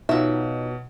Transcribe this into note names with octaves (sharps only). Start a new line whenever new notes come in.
B2 F#3 D#4 F4 E5